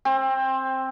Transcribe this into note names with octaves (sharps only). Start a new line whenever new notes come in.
C4